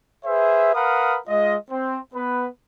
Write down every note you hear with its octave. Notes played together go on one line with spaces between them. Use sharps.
G#4 B4 C5 E5
A#4 B4 F5 F#5 B5 D#6
G#3 F4 D#5
C4
B3 B4